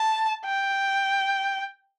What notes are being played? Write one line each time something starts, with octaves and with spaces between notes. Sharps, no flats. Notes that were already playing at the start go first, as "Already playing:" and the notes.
Already playing: A5
G5